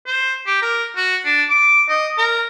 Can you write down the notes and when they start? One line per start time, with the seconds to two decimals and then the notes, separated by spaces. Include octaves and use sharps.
0.07 C5
0.46 G4
0.62 A#4
0.97 F#4
1.25 D4
1.50 D6
1.89 D#5
2.18 A#4